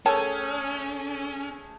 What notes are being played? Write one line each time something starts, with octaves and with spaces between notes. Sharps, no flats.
A3 C#4 G#4 A#4 C#5 G5 A5